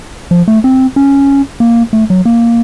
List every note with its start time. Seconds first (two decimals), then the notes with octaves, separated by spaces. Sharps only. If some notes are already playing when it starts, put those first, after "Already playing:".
0.31 F3
0.48 A3
0.64 C4
0.96 C#4
1.60 A#3
1.93 A3
2.10 F#3
2.25 A#3